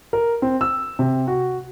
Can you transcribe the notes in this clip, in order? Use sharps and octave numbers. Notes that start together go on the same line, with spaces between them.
A#4
C4
E6
C3
F#4